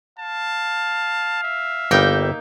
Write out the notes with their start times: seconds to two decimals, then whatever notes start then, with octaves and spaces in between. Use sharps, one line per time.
0.19 F5 A5
1.43 E5
1.91 G1 G3 A#3 D#4 G5